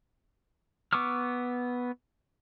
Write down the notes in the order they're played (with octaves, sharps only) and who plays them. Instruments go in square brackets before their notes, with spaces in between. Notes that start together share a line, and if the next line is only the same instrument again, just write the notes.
[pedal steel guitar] B3 C#6 D6 E6 F6